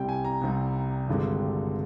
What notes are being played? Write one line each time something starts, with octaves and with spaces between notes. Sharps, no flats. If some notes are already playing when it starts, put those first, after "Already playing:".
Already playing: C2 C3 G3 G5
G#5
A#5
C2 C3 G3
G#1 G2 D3 G#3